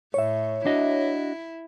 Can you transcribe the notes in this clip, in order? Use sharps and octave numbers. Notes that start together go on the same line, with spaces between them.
A2 C#5 E5
D4 E4 F#4 D#5